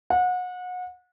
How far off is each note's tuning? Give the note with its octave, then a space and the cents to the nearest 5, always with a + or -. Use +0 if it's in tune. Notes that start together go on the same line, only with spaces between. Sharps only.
F#5 -30